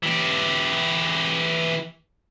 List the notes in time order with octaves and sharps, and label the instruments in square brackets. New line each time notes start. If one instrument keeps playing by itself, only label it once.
[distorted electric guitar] E3 G4